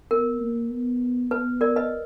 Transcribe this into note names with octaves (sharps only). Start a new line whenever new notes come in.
B3 A#4
A#3
B3
B3 B4
A#4 D5
B4 D#5